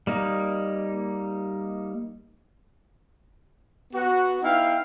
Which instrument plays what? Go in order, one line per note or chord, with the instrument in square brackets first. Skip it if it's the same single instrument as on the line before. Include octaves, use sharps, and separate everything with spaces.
[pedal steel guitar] G3 A#3 D#4
[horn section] B3 F#4
B3 D#4 E4 F5 G5